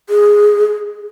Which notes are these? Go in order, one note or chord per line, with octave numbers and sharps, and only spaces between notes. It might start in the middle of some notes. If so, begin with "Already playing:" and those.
G#4